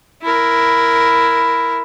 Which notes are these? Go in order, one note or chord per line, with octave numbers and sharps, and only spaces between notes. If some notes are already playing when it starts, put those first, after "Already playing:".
E4 A#4